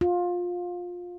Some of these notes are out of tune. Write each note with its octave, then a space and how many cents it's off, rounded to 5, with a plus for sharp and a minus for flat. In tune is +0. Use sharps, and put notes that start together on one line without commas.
F4 +20